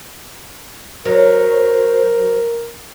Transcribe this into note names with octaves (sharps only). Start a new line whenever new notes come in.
F#3 A#4 C5